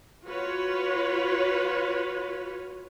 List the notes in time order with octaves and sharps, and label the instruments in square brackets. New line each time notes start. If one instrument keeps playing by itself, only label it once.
[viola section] F4 F#4 B4 C#5